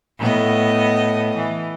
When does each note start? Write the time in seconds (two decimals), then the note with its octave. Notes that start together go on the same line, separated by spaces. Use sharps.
0.19 A2 B3 D#5
1.37 E3